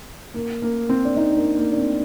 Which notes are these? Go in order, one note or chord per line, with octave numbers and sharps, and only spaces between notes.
A#3
A#3
C4
D4
C4 D#4
A#3 D4
A#3
D4
C4